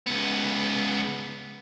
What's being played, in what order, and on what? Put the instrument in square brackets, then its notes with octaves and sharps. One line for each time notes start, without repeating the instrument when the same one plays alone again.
[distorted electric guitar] C#2 B3